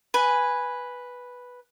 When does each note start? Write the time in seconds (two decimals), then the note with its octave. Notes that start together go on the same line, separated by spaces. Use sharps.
0.14 B4 G#5